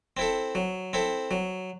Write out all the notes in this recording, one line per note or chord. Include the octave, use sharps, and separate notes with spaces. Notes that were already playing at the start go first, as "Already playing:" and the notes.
C4 E4 A4
F#3
C4 E4 A4
F#3